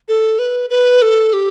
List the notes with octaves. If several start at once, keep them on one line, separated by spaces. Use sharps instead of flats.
A4
B4
B4
A4
G4